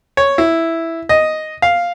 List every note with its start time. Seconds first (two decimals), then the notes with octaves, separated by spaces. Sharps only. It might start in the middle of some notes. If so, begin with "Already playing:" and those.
0.17 C#5
0.38 E4
1.09 D#5
1.62 F5